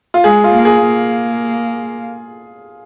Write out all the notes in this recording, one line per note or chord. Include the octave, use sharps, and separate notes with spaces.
F4
G#3 G#4
F4
A#3
G#4
A#3